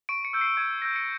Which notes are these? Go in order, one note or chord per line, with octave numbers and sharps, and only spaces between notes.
C#6 D7
C#7
E6 G6
C7
C#6 G#6
E6 G6 A#6
C#7